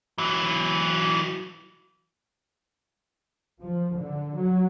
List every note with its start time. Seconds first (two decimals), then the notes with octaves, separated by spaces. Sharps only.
0.18 E3 F#3
3.62 F3
3.97 D3
4.37 F#3